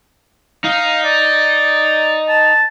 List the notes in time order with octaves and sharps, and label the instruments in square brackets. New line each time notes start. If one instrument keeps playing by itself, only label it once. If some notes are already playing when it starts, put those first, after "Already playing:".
[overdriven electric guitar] D#4 [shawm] F5
[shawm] D5
A5